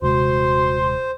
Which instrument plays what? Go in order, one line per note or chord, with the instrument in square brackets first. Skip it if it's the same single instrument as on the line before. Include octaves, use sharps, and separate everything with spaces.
[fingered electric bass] D#1 C3 G#3 [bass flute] F#4 [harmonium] C5 [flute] C6